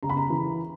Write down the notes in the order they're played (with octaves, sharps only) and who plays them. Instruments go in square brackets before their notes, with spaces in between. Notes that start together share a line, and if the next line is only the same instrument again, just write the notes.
[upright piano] C#3 A#5
B5
A#5
E3